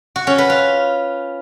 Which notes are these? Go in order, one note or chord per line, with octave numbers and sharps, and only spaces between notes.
F#4
C#4
B4
F4